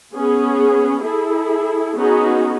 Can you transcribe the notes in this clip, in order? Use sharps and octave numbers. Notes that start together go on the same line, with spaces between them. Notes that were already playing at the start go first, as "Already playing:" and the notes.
B3 C#4 G#4
E4 G#4 A4
B3 C#4 D#4 F#4 G#4